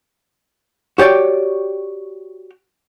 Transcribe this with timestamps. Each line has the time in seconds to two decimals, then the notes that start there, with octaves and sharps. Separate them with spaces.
0.98 F#4 G4 C#5 D5 G5